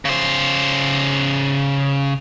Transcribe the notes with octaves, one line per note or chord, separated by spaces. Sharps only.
C#3 C5